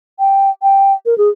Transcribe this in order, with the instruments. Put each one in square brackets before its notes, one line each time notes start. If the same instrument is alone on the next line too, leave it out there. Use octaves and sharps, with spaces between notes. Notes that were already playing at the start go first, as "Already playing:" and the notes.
[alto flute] G5
G5
A#4
G#4